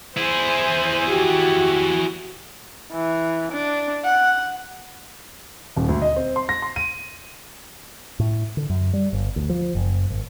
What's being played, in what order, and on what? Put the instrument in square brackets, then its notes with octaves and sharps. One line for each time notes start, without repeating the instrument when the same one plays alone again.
[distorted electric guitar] E4 G#4 [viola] C5 G#5
[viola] F#4 [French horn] G4
[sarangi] E3
D4
F#5
[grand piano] D#1
D2
D#5
C4
C6
A#6
C6
D#7
[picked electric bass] A2
D3
F#2
G3
G1
D2
F3
F#1
G#1